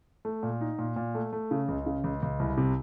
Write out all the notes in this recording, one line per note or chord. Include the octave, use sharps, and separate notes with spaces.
A3
A#2
D#4
A#2
A#2
A3
A3
C#3
C#2
C#3
C#2
C#2
C2
C3